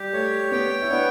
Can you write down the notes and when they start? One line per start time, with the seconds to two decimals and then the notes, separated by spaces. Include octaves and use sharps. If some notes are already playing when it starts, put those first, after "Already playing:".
Already playing: G3 G4
0.13 A3 C#5
0.52 B3 G5
0.82 E4
0.90 B3 D4